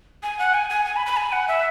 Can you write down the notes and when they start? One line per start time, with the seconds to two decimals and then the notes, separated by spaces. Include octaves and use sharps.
0.23 G#5
0.39 F#5
0.54 G#5
0.70 G#5
0.85 G#5
0.96 B5
1.06 B5
1.17 G#5
1.32 F#5
1.48 E5